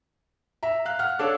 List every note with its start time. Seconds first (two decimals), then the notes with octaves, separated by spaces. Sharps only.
0.63 E5 A#5
0.85 F5 F#6
0.99 F#5 F6
1.19 D4 A4 C#5 F5 D6